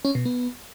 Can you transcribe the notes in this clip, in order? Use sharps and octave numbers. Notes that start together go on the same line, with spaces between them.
C#4
B2
B3